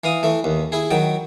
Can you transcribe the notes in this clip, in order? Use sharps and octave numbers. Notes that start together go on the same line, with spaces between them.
E3 F5 D#6
E3 A3
D#2
E4 G#4
D#3 F#3 G5